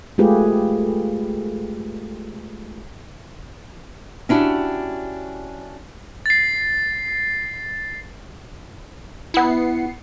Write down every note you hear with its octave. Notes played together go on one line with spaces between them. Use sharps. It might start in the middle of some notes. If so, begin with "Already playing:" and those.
G#3 A3 F4 G4 G#4 B4
C#4 D4 E4 F#4 G4
A6 C7
B3 E4 C7 C#7